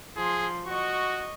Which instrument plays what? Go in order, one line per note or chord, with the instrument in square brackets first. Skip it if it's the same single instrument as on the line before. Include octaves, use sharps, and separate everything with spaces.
[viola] F3 C6 [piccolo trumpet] G#4
[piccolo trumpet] F#4 [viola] D#5 C#6